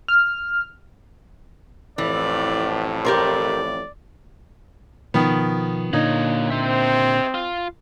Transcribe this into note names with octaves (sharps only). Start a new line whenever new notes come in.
F6
A1 F2 A2 E3 D5
G4 A#4 C5 D5
B2 D#3 F3 B3
A#2 D3 A#3 D#4 C#5
C4 C5 E5
F4